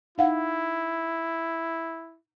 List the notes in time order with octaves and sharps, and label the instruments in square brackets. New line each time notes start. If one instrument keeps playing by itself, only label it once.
[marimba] D#4 F5 F#5 [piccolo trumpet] E4